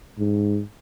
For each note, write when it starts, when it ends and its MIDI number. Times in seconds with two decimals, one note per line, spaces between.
0.19 0.61 44